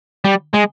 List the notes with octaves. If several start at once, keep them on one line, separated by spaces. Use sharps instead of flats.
G3
G#3